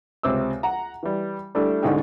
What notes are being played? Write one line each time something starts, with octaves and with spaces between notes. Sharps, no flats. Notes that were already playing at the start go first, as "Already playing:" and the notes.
C#2 C3 C4 D6 E6
F#5 A#5
E3 G3
G3 A3 D4 E4 A4
C2 G#2 D3 G#3 D#4 G5